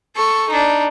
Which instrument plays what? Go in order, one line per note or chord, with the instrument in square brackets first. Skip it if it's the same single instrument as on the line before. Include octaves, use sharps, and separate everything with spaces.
[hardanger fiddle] A4 C#6
D4 D#4